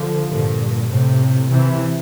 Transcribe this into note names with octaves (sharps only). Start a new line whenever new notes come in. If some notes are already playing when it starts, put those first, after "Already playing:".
Already playing: D3 F3
G2 A#2
A2 C3
C3 E3